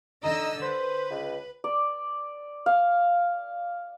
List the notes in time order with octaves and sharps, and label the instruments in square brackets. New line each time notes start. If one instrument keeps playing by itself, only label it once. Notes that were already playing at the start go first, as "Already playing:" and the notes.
[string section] D3 D#5 E6 [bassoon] D#4
[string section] B4 [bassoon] C5
[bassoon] C#2
[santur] D5
F5